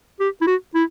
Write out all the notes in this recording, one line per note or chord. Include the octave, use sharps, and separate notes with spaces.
G4
E4
F#4
E4